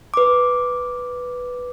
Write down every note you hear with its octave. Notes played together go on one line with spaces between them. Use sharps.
B4 D6